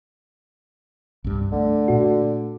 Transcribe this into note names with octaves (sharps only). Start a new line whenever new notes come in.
C2 G2
D3 A3
A#2 F#4